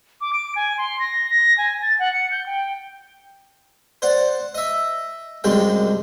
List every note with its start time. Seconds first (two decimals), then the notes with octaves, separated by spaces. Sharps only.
0.21 D6
0.33 D7
0.56 G#5
0.78 C6
1.00 A#6
1.30 A#6
1.58 G#5
1.82 A6
1.99 F#5
2.13 C#7
2.31 G6
2.46 G5
4.02 C5 D5 F#5
4.54 D#5 E5
5.44 C2 F#2 C3 G#3 C4 G5